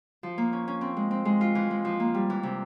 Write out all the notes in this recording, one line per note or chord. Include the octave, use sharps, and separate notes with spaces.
F3
A#3
C#4
C#4
C4
G#3
C4
G#3
F4
E3
G#3
F3
A#3
G3
E3
C3